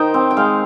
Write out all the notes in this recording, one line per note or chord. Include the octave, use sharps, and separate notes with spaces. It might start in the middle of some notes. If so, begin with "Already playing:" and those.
Already playing: D#3 D#4 C5 G5
C4
G5
G#3 F5